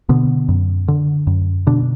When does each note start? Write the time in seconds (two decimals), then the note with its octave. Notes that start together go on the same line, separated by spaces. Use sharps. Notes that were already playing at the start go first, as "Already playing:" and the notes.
0.09 B2 D3 B3
0.49 F#2
0.88 D3
1.27 F#2
1.67 B2 D3 D4